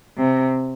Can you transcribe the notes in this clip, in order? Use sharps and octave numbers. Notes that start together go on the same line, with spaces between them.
C3